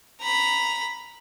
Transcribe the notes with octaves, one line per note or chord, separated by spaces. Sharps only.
A#5 B5